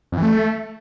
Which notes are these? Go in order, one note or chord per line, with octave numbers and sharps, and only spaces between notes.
F2
E3
A3